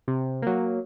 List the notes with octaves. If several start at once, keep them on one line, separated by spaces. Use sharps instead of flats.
C3
F#3 A#3